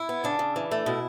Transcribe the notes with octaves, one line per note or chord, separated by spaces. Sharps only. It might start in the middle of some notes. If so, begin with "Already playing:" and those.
Already playing: E4
B3
C#3 D4
C#3
E3
A3
B2 E4